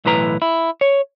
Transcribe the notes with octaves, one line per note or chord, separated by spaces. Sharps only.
B1 A2 E3 B4 A#5
E4
C#5